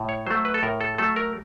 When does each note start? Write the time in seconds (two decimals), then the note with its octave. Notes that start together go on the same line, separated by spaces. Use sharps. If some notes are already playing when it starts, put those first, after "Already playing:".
Already playing: A2
0.09 C#5
0.27 F#3 A3 C5
0.45 B4
0.54 A4
0.63 A2 A#4
0.81 A4
0.98 F#3 A3 A4
1.16 A#4